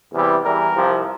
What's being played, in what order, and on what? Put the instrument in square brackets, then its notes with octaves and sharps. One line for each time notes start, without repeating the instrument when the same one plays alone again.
[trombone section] E2 C3 E3 G3
E2 E3 G3 A#4
C2 C3 F3